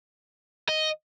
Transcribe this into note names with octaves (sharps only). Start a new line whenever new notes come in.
D#5